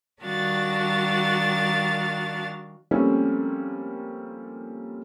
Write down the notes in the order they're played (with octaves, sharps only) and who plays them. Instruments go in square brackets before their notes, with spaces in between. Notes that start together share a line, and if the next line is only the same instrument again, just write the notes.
[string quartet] D#3 G3 D4 F#4 F5 A6
[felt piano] F3 G3 A3 A#3 C4 C#4